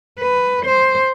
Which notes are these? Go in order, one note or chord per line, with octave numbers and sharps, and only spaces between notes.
B4
C5